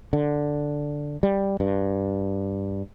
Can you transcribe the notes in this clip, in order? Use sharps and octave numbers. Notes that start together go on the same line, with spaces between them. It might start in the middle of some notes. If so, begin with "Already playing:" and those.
D3
G3
G2